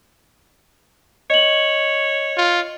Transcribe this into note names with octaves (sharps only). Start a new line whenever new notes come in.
C#5 D#5 F#7
F4